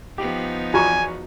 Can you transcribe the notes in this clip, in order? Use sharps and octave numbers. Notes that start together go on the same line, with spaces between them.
F3 B3 D#4 G4
E2 F4 F#4 G#5 A#5 C#6